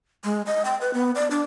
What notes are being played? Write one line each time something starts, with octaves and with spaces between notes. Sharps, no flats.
G#3
D#5
G5
B4
B3
D5
D4